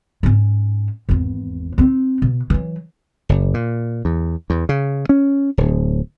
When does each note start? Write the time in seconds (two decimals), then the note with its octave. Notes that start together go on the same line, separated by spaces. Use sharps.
0.23 G#2 C#4
1.09 G#1 E2
1.78 C4 D#4
2.22 B2
2.50 E3 F#3
3.29 F#1
3.54 A#2
4.05 E2
4.50 E2
4.69 C#3
5.09 C#4
5.57 D1